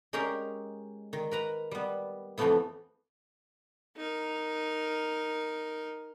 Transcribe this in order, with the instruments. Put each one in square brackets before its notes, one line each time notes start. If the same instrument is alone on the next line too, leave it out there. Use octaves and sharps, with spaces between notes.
[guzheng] G#3 C#4 D#4 G4 G#4 A#4
D#3
A#4 B4 A#5
G3 B3
F2 E3 F3 A3 B3 E4
[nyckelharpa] D#4 A#4